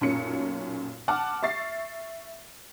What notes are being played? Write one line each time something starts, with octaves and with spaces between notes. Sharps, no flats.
B1 F#2 A#2 C#4 C#7
F#5 A5 D6 F6
E5 C#6 A6 C7